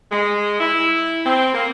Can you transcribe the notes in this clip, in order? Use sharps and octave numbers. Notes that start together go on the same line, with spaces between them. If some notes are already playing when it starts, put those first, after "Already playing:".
G#3
E4
C4
A#3